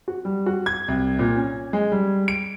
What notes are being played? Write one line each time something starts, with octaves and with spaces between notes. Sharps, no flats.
F#4
G3
F#4
G#6
C2
A#2
C#4
G#3
G3
D7